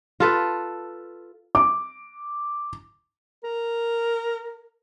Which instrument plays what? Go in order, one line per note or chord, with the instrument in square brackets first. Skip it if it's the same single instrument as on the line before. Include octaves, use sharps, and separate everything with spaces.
[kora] F4 A4 B4
[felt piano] D6
[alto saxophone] A#4